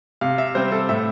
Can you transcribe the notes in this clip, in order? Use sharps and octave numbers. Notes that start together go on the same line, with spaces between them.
C3 F5
E5
G3 C4 C5
A4
A2 E5